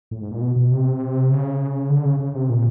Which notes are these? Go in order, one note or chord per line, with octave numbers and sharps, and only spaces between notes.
A2
G#2
A#2
B2
B2
C3
C#3
D3
C#3
C#3
C3
A#2